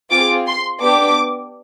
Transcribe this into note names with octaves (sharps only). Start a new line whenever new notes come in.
C4 F4 G#4 D6
C6
B3 D4 G4 D6